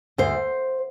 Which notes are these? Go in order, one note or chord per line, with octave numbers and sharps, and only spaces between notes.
D2 C5